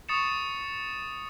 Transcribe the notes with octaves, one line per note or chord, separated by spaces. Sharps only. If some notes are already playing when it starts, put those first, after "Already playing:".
C#6 D#6 A6 C#7 E7